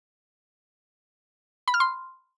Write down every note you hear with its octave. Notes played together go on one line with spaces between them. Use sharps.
B5
F6
C6